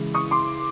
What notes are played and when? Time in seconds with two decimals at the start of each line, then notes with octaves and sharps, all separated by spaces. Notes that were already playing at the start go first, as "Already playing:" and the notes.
Already playing: C#3 E3 G#3
0.14 C#6 D#6
0.31 C6 D6